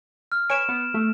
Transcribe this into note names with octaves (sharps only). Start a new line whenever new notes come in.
F6
B4 C#5 G#5 D7 E7
B3
A3